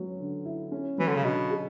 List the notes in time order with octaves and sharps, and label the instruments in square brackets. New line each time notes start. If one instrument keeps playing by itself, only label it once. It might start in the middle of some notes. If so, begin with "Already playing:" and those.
Already playing: [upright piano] F#3 B3 C#4
D3
E4
C#4
[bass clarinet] E3 [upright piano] F#3
[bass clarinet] D3
C#3
[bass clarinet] B2 [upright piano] D3
[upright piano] G#4